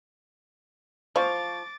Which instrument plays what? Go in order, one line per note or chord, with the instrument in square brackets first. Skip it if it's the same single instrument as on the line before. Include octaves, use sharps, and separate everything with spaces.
[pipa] F3 [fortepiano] C5 F5 C#6 [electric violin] D6 A6